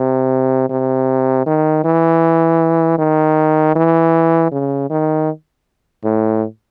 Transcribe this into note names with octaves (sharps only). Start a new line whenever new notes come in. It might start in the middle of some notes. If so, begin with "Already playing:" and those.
Already playing: C3
C3
D#3
E3
D#3
E3
C#3
D#3
A2